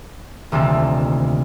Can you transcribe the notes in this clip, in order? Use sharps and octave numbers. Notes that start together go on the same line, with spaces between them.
D#1 D2 C3 A4